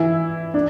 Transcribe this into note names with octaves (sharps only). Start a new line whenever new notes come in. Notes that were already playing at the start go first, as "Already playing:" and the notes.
Already playing: E3 E4
D4